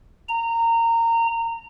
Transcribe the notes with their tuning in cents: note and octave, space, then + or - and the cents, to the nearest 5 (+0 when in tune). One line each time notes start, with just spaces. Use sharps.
A#5 -20